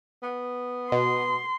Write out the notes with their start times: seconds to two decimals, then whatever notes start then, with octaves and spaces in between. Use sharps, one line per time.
0.23 B3
0.92 B2 C6